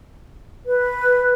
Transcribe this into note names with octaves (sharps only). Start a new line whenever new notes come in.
B4